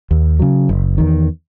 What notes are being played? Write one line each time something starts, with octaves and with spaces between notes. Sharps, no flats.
D#2
C#3 F#3
F#1
E2 D#3